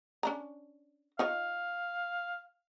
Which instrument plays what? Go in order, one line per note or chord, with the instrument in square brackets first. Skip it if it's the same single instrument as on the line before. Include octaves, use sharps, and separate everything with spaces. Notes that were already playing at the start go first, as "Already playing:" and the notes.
[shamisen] C#4 D4 A#5
[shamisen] D#4 F4 C#5 [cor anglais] F5